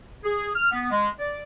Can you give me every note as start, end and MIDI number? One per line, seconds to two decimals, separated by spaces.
0.24 0.50 68
0.55 0.67 89
0.72 0.89 59
0.91 1.08 56
1.19 1.42 74